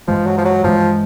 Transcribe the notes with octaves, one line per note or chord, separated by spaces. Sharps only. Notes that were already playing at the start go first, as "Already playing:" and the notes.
G2 E3 F3 G#3
F#3
F3
F#3
G2 E3 F3 G#3